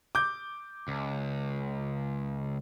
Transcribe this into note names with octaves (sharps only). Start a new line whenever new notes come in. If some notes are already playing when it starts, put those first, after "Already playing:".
D6 G6
C#2